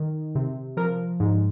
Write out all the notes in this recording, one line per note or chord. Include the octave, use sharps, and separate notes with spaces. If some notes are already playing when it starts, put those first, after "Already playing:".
Already playing: D#3
C3
F3 A#4
G#2